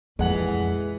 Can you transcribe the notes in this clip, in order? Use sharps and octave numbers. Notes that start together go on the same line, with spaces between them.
F2 A#2 E3 G#3 F#5 F#7